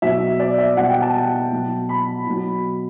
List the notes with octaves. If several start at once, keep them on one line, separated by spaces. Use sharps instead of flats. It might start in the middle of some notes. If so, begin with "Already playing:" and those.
B2 F#3 E5
D5
E5
B2 G3 F#5
G5
A5
A5
B2 F#3
B5
B2 F#3